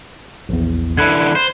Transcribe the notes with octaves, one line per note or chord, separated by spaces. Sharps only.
A#1 E2
D3 E3 B5 F#6 G#6
C5